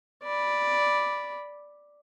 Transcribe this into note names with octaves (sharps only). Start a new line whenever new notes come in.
D5 B5